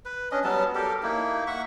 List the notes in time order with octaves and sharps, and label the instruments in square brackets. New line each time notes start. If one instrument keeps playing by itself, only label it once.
[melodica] B4
C#4 D4 D#5
F#3 G3 B3 A5
G4 A4 A#4
A#3 D#4 E4
E5 F#5 C#6